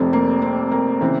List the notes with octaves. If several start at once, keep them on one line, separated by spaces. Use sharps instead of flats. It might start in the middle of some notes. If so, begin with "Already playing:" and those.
Already playing: F1 F2 C3 C4
A#3
C4
A#3
C#3 E3 C4